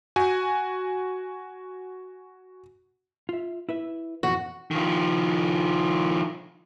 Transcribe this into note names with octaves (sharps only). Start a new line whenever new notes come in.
F#4 G#5
F4 E5
E4 B4 E5
F2 B2 E3 F#4
D#3 F3